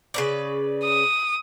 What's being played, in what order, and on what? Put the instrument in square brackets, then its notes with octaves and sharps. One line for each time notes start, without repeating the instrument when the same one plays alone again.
[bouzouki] C#3 B4 D5
[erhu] D#6